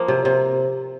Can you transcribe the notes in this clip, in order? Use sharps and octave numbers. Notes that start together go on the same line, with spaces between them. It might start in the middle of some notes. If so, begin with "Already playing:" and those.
Already playing: F3 A#3
C3
C3